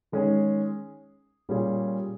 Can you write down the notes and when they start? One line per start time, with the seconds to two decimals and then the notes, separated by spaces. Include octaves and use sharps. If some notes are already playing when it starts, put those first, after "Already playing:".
0.12 D#3 G#3 C#4 G#4
1.49 A#2 G3 C#4 F4 G#4